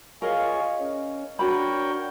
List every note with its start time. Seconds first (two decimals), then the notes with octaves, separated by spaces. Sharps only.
0.22 F4 G#4 A#4 C#5 D#5 F5
0.79 C#4
1.39 D4 F#4 A#4 C#5 G5 B5